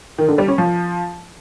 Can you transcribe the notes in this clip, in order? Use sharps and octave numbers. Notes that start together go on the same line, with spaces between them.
D#3
D3
G3
C#4
F3